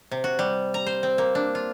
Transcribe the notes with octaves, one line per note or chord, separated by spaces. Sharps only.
C3
F#4
G3
A#5
C5
C4
A#3
D4
F4